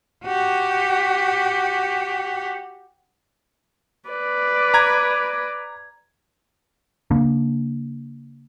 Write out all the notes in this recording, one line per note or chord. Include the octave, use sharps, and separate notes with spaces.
F#4 G4
B4 D5
A#5 G#6
C#3 A#3 D4